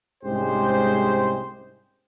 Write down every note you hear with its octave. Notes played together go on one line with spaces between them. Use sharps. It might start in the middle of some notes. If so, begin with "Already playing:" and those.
C2 G#2 G#3 C#4 G4 C5